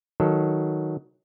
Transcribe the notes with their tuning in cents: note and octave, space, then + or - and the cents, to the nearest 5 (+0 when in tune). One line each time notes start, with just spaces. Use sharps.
D#3 +10 F#3 +0 A4 +0